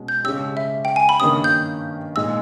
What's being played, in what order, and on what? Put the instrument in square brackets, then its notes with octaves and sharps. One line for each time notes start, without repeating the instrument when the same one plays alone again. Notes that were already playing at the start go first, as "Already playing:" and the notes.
Already playing: [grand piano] B2 G#3 C#4
[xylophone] G6
[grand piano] C#3 G#3 C#4 G4 [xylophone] E6
[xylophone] E5
G5
G#5
B5
[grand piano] G2 D#3 A#3 C#4 G4 [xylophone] D#6
[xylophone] G6
[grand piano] A#2 G#3 D#4 [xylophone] E6